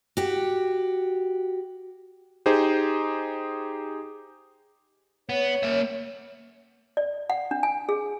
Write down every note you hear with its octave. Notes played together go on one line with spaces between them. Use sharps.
F#4 G4
D#4 G4 G#4 C5
B3 C#5
A#3 E5
D5
F#5
D4
G#5
G#4